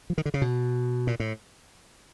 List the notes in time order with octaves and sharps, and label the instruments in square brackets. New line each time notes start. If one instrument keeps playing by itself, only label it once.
[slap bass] F3
D#3
D3
C#3
B2
A#2
A2